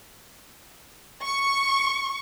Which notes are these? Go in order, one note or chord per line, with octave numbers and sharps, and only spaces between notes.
C#6